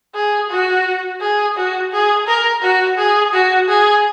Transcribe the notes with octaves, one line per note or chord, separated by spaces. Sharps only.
G#4
F#4
G#4
F#4
G#4
A#4
F#4
G#4
F#4
G#4